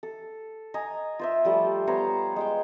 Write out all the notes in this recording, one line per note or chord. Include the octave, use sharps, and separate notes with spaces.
A4
D#5 G#5 A#5 D#6
F4 C5 E5
F3 G3 A3 G4
B3 C5 C#5 A#5
G#3 F5 G5